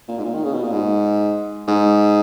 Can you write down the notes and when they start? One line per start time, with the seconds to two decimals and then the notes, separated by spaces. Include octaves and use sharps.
0.08 A#2
0.18 G#2
0.24 A#2
0.34 D#3
0.44 C#3
0.54 B2
0.63 A#2
0.72 G#2
1.68 G#2